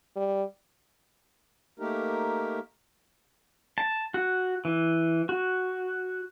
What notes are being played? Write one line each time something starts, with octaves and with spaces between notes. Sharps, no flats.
G3
A3 A#3 D#4 G4 A#4
A5
F#4
E3
F#4